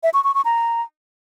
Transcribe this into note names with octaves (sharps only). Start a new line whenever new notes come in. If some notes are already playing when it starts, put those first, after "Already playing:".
E5
C#6
C#6
C#6
A#5